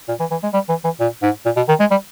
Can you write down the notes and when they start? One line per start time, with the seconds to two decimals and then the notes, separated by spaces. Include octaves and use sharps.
0.08 A#2
0.20 E3
0.31 E3
0.43 G#3
0.53 G3
0.69 E3
0.84 E3
1.00 A#2
1.22 G#2
1.45 A#2
1.56 B2
1.68 D#3
1.80 G#3
1.91 G3